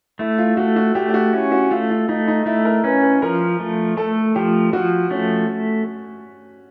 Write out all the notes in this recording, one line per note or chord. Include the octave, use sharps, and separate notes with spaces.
A3 E4
F4
A3 F#4
F#4
A3 G4
G4
F#4
C#4 E4
F#4
A3 F4
F4
A3 D#4
D#4
A3 E4
A#4
C#4 B4
B4
F3 A#4
A3
A3 A4
F3 G4
F3 F#4
A3 C#4